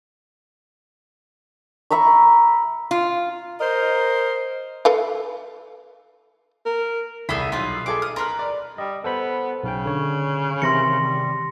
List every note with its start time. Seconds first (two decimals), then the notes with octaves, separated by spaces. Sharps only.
1.91 E5 A#5 B5 C#6
2.91 F4
3.61 A#4 C5 D#5
4.85 A4 B4 F5
6.66 A#4
7.29 C2 G#4 A4 B5
7.52 B1 F4 G#4 B4
7.86 D#4 G#4 A4 D6
8.02 D#6 F6
8.16 A#4 B4 C6 F6
8.39 D5
8.78 G3 D#5
9.04 B3 A4 C5 B5
9.64 B1 C#3 G5
9.85 D3 C#5
10.62 C3 D#3 E3 C6 A#6 C#7
11.00 G3